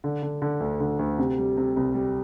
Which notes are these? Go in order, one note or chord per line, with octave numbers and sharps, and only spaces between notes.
D3
D3
D3
D2
D3
D2
C3
G3
C3
C2
G3